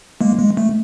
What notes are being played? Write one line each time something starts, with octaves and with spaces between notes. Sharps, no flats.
G#3 A#3
G#3
A3